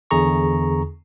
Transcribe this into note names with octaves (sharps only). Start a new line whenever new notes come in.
E2 D3 G#4 A#5 C#6